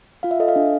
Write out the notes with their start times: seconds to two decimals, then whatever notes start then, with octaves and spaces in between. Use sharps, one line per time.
0.23 F4 F5
0.31 E5
0.40 A4 D#5
0.48 F5
0.56 D4